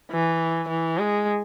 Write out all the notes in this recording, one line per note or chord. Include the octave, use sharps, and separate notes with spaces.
E3
E3
G#3